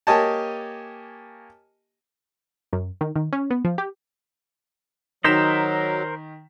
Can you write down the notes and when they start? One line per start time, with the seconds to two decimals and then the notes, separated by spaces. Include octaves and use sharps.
0.07 A#3 G4 C#5 D#5 G#5 A5
2.73 F#2
3.01 D#3
3.16 D#3
3.33 C#4
3.50 B3
3.65 F3
3.78 G4
5.24 D#3 F#3 A#4 C5 D#5 B6 E7